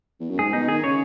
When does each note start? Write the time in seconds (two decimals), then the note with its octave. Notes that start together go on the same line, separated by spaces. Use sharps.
0.20 E2
0.30 F#2
0.39 G#2 G#4
0.53 B2 D#4
0.68 D#3 G#4
0.84 C#3 C#5